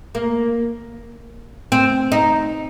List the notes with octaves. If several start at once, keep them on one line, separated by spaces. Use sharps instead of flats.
A#3
C4
D#4